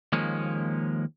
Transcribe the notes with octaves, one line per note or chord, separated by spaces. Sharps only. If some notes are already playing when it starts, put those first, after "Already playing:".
D#2 F3 G#3 A#3 C#4